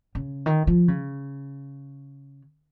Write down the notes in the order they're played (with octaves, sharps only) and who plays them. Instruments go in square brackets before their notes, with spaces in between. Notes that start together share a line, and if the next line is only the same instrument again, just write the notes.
[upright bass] C#3
D#3
F3
C#3